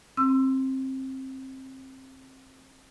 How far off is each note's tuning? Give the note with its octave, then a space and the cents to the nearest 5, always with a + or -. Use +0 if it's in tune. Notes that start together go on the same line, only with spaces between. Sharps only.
C4 +20 C6 -35 E6 +20